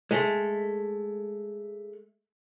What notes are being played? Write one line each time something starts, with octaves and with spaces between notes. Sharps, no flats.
G#3 A3